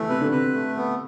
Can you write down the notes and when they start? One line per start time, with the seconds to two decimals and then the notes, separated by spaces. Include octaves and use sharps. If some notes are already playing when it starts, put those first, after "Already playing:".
Already playing: E3 A3
0.09 C3 B4
0.21 D3
0.31 C3 B4
0.54 A3
0.76 B3